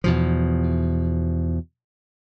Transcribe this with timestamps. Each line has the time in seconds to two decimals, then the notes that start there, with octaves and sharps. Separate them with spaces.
0.04 E2 B2 F3